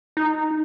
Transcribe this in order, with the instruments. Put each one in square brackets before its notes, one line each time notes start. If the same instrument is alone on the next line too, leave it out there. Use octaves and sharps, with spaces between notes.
[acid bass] D#4